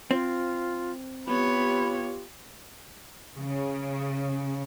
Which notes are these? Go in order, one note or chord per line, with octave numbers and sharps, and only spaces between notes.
C4 F4
B3 F4 G4 C#5 B5
C#3